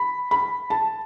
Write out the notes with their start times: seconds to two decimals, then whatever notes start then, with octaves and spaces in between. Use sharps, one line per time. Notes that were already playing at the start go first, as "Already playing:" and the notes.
Already playing: B5
0.31 B5
0.70 A5